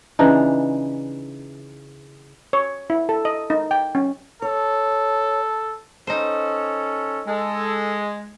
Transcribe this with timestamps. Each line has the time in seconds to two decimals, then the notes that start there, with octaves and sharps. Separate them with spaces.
0.19 C#3 E3 D4 D#4
2.53 C#5
2.90 E4
3.09 A4
3.25 D#5
3.50 D#4
3.71 G5
3.95 C#4
4.42 A4 C#5
6.07 C#4 D#4 A4 C5
7.28 G#3 A4